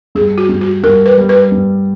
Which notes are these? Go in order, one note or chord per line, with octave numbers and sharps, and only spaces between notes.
G2 G#4
F#4
G2
F#4
G2 A#4
B4
G3
B4
G2